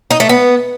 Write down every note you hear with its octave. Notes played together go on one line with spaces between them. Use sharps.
D#4
A3
B3